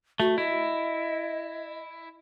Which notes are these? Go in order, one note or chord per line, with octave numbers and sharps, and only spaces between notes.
A3 F#4
E4 D#5